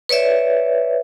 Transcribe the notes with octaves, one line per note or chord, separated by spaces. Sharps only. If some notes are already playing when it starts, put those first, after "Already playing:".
B4 C#5 D5 E5